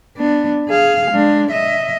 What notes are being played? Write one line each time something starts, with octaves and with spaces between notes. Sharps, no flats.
B3 D4
G#4 F5
G#3 D4
D#5 E5